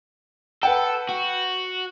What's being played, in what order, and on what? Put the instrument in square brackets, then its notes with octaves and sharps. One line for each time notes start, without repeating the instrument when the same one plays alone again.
[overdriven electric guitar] A4 [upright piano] B4 F#5 G5
[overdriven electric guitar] F#4